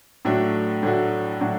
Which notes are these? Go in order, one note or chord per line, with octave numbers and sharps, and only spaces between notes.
A2 F#3 A3 D4 F#4
A2 F#3 A3 D4 F#4
A2 F#3 A3 D4 F#4